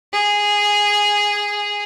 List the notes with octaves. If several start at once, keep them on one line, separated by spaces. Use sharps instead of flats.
G#4